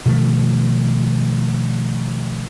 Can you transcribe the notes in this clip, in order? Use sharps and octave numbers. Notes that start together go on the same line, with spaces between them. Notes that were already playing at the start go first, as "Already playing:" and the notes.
B2 D#3 F3 A3